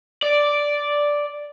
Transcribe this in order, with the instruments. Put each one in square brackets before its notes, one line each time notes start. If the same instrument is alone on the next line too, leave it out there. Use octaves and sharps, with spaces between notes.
[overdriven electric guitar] D5